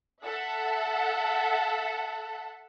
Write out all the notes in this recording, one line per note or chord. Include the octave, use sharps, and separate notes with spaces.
A4 E5 F#5